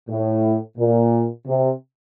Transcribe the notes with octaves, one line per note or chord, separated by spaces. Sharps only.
A2
A#2
C3